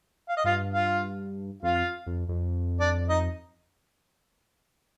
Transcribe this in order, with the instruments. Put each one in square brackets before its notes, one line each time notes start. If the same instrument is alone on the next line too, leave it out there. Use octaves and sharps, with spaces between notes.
[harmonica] F5
D#5
[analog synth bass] G2 [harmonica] F4 F5
[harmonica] F4 F5
[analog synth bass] F2 [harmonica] F4 F5
[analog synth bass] F2
F2
[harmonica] D4 D5
D#4 D#5